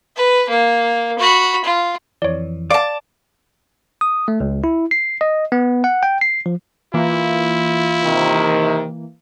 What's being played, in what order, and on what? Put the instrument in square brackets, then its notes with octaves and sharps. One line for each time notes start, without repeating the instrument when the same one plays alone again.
[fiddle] B4
A#3
F#4 B5
F4
[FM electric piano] F2 E3 [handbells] C#5 D5
[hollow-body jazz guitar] D5 [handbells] F5 [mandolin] A5 D6
[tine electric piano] D#6
A3
C#2
E4
C7
D#5
B3
F#5
G5
C7
F3
[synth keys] E3 A#3 [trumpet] E4 [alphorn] F4
[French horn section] C3 D#3